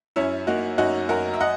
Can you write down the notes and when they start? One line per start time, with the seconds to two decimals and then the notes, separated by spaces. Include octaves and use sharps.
0.16 F#2 C#4 E4
0.47 A#3 D#4 F#4
0.78 F#2 D#4 F#4
1.09 F#2 F#4 A#4
1.34 E5
1.41 D#5 F#5